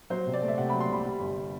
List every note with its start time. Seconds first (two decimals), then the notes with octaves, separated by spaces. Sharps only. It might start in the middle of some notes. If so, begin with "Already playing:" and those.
0.10 F#3 C5
0.26 C3
0.33 D5
0.42 A3
0.48 E5
0.58 C3 F#5
0.70 F#3 B5
0.80 C6
0.89 C2 B5
1.05 G3
1.20 G1